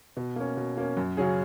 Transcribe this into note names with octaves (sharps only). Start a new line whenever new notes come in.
B2
A#3 C#4
B2
A#3 C#4
F#2
C#3 F#3 C#4 G#4